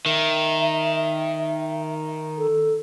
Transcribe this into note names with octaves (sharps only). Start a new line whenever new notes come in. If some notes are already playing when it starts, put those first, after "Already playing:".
D#3 E5
A4